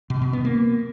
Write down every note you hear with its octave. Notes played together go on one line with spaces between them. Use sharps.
B2
B2
B3
A#3